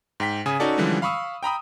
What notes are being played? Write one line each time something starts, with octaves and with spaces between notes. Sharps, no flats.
G#2 G5 B6
C#3 G#5 D#6
C#4 D#4 F#4 A4 D5
D3 E3 F3 G3 G#3 C#4
F5 B5 C#6 D#6 E6
G5 A#5 B5 D#6